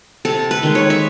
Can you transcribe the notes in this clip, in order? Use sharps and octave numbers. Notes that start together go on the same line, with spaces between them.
C3 A4
B4
D#3 G#3
C#5
E5